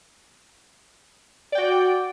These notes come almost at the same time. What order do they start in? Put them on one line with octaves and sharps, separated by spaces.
D5 G5 F#4